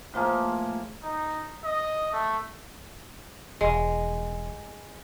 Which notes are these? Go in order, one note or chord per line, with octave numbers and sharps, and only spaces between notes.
A2 F3 A#3 G#4
D#4
D#5
A3
E1 G#3